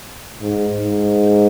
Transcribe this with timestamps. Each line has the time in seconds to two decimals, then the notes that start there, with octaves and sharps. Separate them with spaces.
0.41 G#2
0.77 G#2